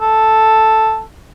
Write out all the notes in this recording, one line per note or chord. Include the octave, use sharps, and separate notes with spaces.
A4